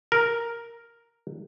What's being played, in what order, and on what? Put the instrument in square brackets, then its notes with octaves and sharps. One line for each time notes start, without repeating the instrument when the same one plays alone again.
[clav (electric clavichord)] A#4